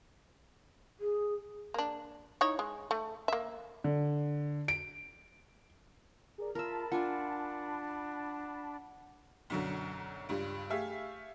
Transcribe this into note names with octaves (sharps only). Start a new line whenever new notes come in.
G#4
A#3 D4
D#4 E4 C#5
G#3
A3
A#3 E5
D3
D7
G#4 A#4 D5
F4 A#4 E5 A5 B5
D4 F4 F#5 G#5
B1 F#2 D3
C#2 G2 G3
A3 G4 G#4 E5 F5